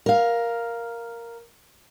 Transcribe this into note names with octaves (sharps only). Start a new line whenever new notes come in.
A#4 F5